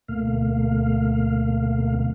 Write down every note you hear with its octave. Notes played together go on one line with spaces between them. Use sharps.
D2 B2 A3 A#3 F5